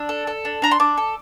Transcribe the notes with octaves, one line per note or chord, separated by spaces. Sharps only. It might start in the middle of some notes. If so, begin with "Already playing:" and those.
Already playing: D4 E6
A4
A4
D4
D4 A#5
C6
D4 D6
A4